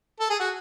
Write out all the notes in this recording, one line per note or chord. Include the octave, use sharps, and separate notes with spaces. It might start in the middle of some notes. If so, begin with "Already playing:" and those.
A4
G#4
F#4